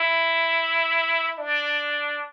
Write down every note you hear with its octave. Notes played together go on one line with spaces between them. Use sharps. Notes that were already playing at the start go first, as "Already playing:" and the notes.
Already playing: E4
D4